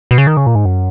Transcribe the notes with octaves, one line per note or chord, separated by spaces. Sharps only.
B2
C#3
D#3
C#3
A#2
G#2
F#2